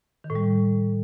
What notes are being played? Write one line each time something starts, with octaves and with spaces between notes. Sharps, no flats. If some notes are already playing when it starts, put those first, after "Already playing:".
D#3
A2
G3